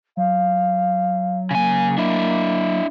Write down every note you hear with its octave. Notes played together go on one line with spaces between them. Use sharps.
F#3 F5
C#3 A#3 G#5
D4 E4